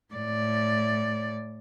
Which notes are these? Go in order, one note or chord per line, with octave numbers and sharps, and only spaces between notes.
A2 D5